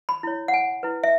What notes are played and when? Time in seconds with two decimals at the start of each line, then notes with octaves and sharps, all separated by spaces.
0.09 B5
0.23 E4 C#5
0.48 F#5
0.54 G#5
0.83 E4 B4
1.04 E5